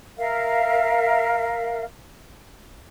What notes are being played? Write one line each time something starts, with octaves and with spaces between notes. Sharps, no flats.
A#4 E5 F5